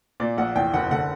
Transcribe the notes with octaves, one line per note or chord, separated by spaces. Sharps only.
A#2 D5
A#1 F#5
E2 G5
F#1 F#5
D3 F#5